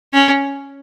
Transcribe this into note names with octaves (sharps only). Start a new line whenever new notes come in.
C#4